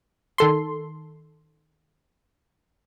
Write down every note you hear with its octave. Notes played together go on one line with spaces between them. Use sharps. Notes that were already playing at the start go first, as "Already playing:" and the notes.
D#3 A4 C6